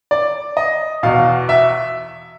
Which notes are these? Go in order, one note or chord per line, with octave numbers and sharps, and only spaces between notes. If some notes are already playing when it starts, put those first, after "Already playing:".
D5
D#5
E2 B2 F5
E5